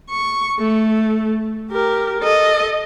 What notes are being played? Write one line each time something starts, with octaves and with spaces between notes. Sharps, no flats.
C#6
A3
G4 A#4
A4 D#5